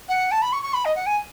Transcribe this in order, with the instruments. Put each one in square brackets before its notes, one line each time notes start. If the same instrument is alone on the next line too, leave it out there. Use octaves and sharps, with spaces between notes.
[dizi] F#5
A5
B5
C#6
C#6
B5
D#5
F#5
G#5